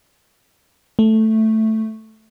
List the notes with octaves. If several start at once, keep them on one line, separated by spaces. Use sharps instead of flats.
A3